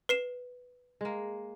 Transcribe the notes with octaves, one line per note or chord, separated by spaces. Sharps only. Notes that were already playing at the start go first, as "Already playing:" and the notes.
B4 C7 E7
G#3 A#3